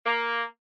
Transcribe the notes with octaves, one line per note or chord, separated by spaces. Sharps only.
A#3